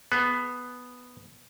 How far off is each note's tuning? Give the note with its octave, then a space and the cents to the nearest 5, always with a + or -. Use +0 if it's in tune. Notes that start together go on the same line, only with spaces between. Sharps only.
B3 +0 G#4 +35